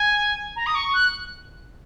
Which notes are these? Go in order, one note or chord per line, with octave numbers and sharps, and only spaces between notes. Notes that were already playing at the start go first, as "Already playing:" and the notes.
Already playing: G#5
A#5
D#6
C#6
F#6